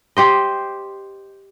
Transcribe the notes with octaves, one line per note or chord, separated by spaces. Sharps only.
G4 C5 D#5